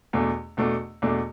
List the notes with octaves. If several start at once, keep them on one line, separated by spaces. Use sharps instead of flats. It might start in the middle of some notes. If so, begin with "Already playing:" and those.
E2 B2 A3 D4
E2 B2 A3 D4
E2 B2 A3 D4